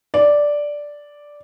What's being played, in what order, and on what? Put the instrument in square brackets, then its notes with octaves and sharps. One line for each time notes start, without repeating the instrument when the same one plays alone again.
[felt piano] D5